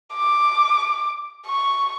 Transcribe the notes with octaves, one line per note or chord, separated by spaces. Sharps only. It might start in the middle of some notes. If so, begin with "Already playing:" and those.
D6
C#6